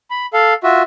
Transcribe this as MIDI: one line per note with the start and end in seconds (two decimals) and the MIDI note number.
0.11 0.26 83
0.33 0.54 69
0.33 0.54 77
0.63 0.82 65
0.63 0.82 66
0.63 0.82 76